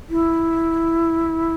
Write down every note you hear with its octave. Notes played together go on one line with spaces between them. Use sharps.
E4